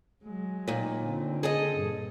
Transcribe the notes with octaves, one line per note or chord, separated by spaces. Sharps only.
F#3 G#3
D#2 A#2
D3 C4
G#4 A4 D#5
G2 A#2